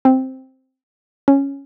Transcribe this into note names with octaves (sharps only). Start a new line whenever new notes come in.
C4
C#4